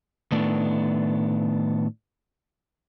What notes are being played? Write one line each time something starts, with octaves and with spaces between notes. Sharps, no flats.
A2 D#3 A3 B3 D4 E4